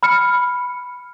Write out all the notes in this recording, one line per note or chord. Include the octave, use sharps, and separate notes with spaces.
B5 F6 C#7